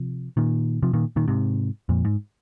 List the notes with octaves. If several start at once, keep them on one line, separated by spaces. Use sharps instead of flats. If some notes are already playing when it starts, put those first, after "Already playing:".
Already playing: C3 F3
A#2 D#3
C3 F3
A#2 D#3
A#2 D#3
G#2 C3
F2 A#2
G#2